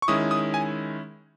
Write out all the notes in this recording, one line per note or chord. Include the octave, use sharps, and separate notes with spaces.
C#6
D#3 G#3 C#4 E4 D#6
D#6
G#5